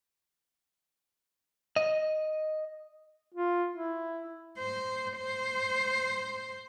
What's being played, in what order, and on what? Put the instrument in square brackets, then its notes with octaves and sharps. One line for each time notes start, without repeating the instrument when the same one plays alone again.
[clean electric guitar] D#5
[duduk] F4
E4
[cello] C5
C5